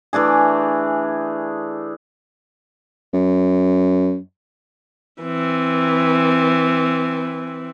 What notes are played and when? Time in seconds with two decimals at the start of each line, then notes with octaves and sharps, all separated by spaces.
0.13 E3 A3 D4 G#4
3.13 F#2
5.22 E3 C4